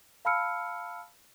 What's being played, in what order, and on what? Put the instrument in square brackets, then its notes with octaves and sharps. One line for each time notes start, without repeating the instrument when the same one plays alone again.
[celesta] F5 A5 B5 E6 F6 C#7